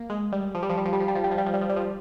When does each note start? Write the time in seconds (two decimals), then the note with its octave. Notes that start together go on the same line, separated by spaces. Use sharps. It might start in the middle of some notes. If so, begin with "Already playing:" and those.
Already playing: A#3
0.10 G#3
0.32 G3
0.55 F3
0.63 G3
0.70 F3
0.78 G3
0.85 F3
0.93 G3
1.00 F3
1.08 G3
1.15 F3
1.24 G3
1.31 F3
1.38 G3
1.46 F3
1.54 G3
1.61 F3
1.69 G3
1.76 F3